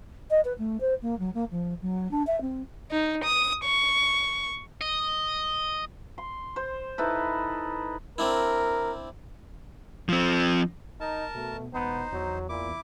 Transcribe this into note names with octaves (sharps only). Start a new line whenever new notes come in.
D#5
B4
A3
C5
A#3
F#3
A#3
F3
F#3
D4
E5
C4
D#4
D#6
C#6
D#5
C6
C5
D#4 E4 A4 B4
C4 D4 E4 A#4
F3 C4
D#4 A#4 A5
B2 A3
E1 B3 D#4 C5
E2 F#3
A#2 E4 D6